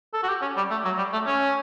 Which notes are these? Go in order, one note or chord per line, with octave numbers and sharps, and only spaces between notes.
A4
F#4
G4
C#4
G3
A3
F#3
G3
A3
C#4